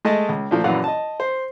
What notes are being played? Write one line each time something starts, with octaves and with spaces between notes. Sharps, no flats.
G#3 A3 D#5 A5
C#2
A#2 F3 A3
A#1 F#2 E3 F5 F#5
D#5 A5
C5